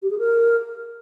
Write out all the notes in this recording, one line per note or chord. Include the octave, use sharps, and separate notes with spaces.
G4
G#4
A#4